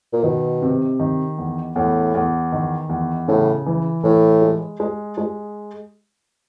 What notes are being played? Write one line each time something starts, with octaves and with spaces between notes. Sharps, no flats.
A#2
B2 D#3
C3
D#3
E2
E2 A2
E2
D#3
E2
A2 C#3
E3
A2 E3
G#3
G#3
G#3